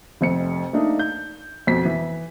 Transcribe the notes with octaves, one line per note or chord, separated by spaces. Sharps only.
F1 F2 C#7
A3 A#3 D4 D#4
G6
F2 B2 B6
E3